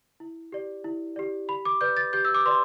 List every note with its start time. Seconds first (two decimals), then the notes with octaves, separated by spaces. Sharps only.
0.20 E4
0.52 G4 D5
0.84 E4
1.16 G4 D5
1.48 G4 B5
1.65 D6
1.81 B4 D5 G6
1.97 A6
2.13 G4 G6
2.25 E6
2.34 D6
2.45 B4 D5 C6